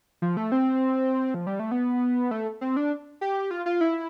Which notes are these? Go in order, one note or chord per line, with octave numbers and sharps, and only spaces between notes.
F3
A3
C4
F3
G3
A3
B3
A3
C4
D4
G4
F4
F4
E4